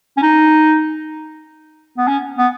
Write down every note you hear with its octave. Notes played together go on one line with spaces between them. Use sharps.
C#4
D#4
B3
C#4
B3